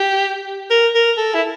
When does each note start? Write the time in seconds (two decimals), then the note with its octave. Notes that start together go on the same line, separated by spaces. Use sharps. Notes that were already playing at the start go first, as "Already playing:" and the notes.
Already playing: G4
0.71 A#4
0.95 A#4
1.17 A4
1.34 E4